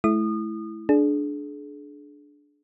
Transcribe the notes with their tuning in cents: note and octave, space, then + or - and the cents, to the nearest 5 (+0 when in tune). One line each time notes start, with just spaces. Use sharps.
A3 -35 E4 +0 D#6 -30
D4 +0 G#4 +35